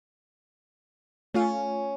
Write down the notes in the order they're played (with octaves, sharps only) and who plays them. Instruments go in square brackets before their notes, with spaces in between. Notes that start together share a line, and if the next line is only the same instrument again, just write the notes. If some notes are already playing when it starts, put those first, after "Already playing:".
[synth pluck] A3 F4 F5 [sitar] C#4